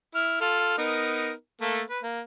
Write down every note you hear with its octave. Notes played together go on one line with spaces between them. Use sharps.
E4 F6
F4 A4 F6
B3 D#4 A#4
A3 A#3 A4
B4
A#3